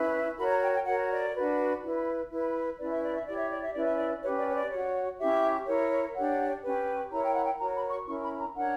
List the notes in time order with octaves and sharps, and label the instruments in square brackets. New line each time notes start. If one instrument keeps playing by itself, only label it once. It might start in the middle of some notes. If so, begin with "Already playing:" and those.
Already playing: [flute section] C#4 E4 B4
F#4 A#4 C#5 B5
A#5
G5
G5
F#4 A#4 C#5 F#5
D5
D4 F#4 B4
E4 B4
E4 B4
C#4 E4 B4 D5
E5
D5
E5
E4 G4 C#5 D5
E5
D5
E5
C#4 E4 B4 D5
E5
D5
C#4 G4 B4 C#5
D5
C#5
D5
F#4 C#5
C#4 E4 G4 E5
E4 A#4 C#5
D4 G4 C#5 F#5
C#4 G4 B4
E4 A#4 C#5 A#5
G5
F#5
G5
F#4 A#4 C#5 A#5
B5
C#6
C#4 E4 A#4 C#6
B5
A#5
D4 A#4 C#5 F#5